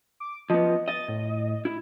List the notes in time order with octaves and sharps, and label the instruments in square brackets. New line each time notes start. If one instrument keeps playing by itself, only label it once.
[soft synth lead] D6
[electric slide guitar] F3 B3 [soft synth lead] D#5
[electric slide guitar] D#5 [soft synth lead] A6
[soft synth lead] A2
[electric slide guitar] E4